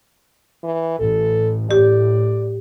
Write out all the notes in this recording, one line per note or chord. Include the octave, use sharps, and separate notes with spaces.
E3
A1 A4
A2 G4 D5